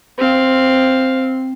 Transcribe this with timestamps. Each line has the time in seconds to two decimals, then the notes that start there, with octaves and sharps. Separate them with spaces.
0.18 C4 F5